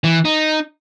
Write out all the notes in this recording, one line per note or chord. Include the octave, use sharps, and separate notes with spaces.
E3
D#4